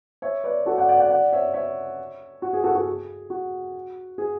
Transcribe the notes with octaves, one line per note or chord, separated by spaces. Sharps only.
C#5 E5
B4 D5
F#4 A4
D5 F#5
D5 F#5
D5 F#5
D5 F#5
C#5 E5
C#5 E5
F#4
G#4
F#4 A4
F#4 A4
G#4
F#4
G#4